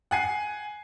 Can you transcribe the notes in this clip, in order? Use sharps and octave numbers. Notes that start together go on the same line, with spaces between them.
F#5 G#5 C7